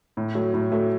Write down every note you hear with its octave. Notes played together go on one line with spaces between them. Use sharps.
A2
F#3 A3
A2
F#3 A3